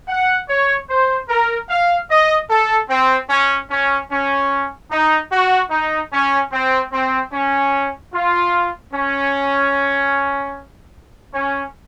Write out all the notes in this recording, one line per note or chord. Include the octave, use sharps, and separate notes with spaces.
F#5
C#5
C5
A#4
F5
D#5
A4
C4
C#4
C#4
C#4
D#4
F#4
D#4
C#4
C4
C4
C#4
F4
C#4
C#4